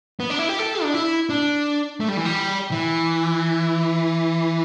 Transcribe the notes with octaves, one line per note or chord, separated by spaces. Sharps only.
B3
D4
E4
G4
A4
D4
E4
D4
A3
G3
E3
G3
E3